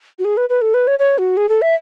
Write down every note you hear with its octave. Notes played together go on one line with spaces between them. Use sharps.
F#4
G#4
B4
B4
A4
B4
C#5
C#5
F#4
G#4
A4
E5